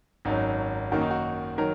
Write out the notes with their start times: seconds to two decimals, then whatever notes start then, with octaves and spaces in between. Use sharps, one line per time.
0.25 G#1 F#2 F#3 D#4
0.92 F#2 D#3 A#3 F#4
1.01 D#4
1.11 F#4
1.58 D#3 F#3 A#4